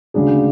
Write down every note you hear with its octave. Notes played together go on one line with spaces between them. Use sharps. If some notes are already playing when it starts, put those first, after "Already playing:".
D2 C#3 G#3 D4 G#4